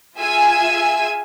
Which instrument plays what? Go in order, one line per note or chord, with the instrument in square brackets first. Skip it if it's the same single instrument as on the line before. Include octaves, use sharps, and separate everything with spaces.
[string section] F4 G#4 E5 G#5 E6